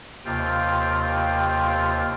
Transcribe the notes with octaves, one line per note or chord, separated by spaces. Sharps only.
D#2 C3 F4 G5